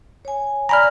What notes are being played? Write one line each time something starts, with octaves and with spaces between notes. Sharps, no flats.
C#5 G#5
D5 G#5 A#5 B5 F6